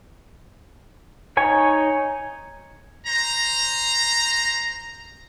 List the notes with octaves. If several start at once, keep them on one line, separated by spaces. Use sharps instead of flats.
D#4 C#5 G#5
C5 A#5